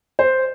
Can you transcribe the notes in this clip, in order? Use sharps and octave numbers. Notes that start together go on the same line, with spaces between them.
C5